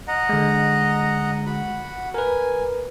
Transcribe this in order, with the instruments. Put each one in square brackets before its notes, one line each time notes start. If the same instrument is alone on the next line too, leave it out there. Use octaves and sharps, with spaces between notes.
[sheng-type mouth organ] D#5 F#5 A#5
[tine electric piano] D3 G#3
[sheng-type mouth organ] F#4 F#5 B5
[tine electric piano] A#4 B4 [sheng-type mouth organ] G#5